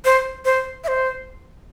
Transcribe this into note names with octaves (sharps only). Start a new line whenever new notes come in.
C5
C5
E5
C5